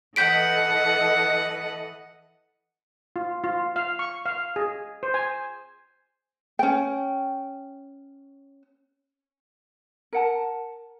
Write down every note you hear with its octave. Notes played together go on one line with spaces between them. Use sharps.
E3 A4 D#5 F#5 G6 B6 D7
F4
F4
F5
C#6
F5
G#4
C5
G#5
C#4 G5
A#4 F#5 A5